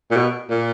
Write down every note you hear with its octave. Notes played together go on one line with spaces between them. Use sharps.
A#2
B2
A#2